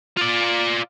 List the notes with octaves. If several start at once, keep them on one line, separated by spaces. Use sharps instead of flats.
F4 D5